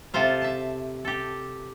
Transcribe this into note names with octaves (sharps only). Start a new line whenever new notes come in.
C3 F4 A4 C5 F5
E5 A5
G4 A4